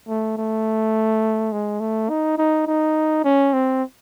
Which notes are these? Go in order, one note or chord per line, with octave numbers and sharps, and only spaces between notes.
A3
A3
G#3
A3
D#4
D#4
D#4
C#4
C4